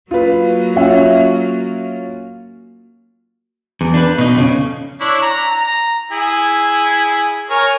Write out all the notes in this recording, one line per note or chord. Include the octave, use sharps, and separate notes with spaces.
F#3 A#3 F4 B4
C#4 F4 E5
E2
D4 B4
B2 D#4
F2 C#3
D4 E4 C#5
A#5
A#5
E4 G#4
A#4 C#5 G#5